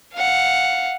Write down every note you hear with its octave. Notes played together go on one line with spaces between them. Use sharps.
F5 F#5